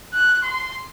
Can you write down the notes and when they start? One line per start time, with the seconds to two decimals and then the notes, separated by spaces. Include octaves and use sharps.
0.14 F#6
0.43 C6